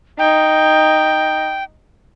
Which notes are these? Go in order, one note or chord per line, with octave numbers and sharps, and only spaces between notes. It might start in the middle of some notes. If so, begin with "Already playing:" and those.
D#4 G5